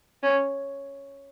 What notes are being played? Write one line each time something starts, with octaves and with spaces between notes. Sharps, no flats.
C#4